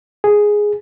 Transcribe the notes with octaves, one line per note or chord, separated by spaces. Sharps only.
G#4